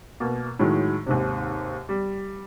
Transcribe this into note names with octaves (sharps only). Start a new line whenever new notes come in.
B2 A#3
A2 D#3 F#3 G#3
D#2 G#2 C3
G3